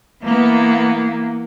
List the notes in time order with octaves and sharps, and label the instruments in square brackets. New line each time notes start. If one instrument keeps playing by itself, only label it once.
[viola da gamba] E3 B3 [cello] A#3